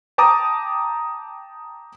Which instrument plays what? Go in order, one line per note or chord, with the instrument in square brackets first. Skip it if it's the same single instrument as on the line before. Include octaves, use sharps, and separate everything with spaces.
[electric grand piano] G5 A5 A#5 D6 D#6